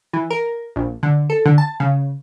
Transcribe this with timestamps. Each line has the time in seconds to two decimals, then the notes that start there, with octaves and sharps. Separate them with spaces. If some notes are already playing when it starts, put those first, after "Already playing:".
0.13 E3
0.31 A#4
0.76 A#1
1.03 D3
1.30 A4
1.46 D3
1.58 A5
1.80 C#3